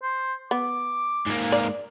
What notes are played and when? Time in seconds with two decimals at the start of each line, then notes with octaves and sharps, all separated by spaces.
0.03 C5
0.51 B3 D6
1.27 G#2 A#3
1.52 D5